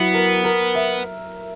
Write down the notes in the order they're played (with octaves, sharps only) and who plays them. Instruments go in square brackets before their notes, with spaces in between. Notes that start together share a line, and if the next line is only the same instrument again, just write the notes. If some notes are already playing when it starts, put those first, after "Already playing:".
Already playing: [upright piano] F#3 E4 [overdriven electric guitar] B3
[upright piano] A#4
A#4
E5